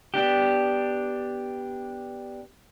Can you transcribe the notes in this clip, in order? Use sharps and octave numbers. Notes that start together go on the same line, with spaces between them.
B3 D4 G4